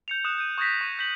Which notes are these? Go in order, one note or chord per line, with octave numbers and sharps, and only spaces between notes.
G6 C#7 F7
D#6 F#6 E7
G6 D#7
C#6 D#6 G6 G#6 A#6 B6
C#6 D#7
G6 B6 F#7